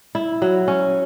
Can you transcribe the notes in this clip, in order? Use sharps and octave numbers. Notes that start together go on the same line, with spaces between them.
E4
F#3
C#4